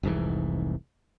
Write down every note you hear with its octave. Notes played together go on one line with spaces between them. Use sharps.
F1 C2 G#2 E3